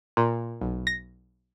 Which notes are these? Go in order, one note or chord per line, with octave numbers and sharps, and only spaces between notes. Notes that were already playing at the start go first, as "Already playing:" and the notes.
A#2
B1
A#6